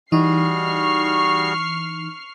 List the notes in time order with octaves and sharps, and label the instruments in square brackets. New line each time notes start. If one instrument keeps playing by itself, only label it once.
[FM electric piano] E3 D#4 [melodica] G3 F#4 G#4 [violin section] C#6 F6 C7